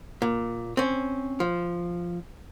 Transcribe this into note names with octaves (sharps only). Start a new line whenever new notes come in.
A#2
C4 C#4
F3